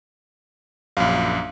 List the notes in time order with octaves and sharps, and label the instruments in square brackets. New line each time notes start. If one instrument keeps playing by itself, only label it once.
[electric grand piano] A#1 F#2 [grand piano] F5